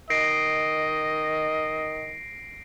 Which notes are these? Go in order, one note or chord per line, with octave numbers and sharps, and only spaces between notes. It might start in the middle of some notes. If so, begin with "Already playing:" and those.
D#3 D#5 A#6 C7 D7